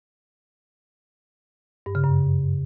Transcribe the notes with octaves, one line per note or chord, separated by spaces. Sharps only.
G2
C#3
F#2